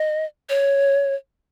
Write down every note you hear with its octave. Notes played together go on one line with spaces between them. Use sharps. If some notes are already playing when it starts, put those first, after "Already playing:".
Already playing: D#5
C#5